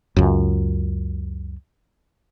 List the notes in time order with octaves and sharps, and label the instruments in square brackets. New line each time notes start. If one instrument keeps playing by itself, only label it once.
[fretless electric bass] C#2 F#2